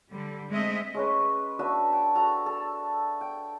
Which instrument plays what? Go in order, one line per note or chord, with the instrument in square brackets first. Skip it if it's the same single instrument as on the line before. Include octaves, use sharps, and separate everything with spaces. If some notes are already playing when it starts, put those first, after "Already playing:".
[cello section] D3 G3
G#3 A3 C4 D#5 E5
[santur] G#3 C#4 B4
D4 F#4 B4 E5
G5 A5
F#4 A4 A#5
A4
G5